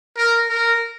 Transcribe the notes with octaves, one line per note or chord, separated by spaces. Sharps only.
A#4
A#4